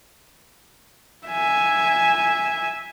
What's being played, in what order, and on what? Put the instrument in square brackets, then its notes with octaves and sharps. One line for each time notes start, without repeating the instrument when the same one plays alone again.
[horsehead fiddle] E5 G#5